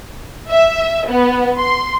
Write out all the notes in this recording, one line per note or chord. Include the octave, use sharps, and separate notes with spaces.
E5
B3
C6